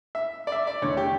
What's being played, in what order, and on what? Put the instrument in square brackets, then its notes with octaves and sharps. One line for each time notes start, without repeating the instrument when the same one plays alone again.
[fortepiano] E5
D5
E5
D5
E2 D3 A3 C#5
G4